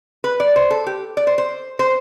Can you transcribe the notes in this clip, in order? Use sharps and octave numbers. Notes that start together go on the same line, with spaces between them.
B4
D5
C5
A4
G4
D5
C5
C5
C5